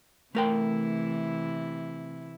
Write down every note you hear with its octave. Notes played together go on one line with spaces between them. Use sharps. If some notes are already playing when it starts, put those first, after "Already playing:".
C3 E3 A3 E4 A#4 G5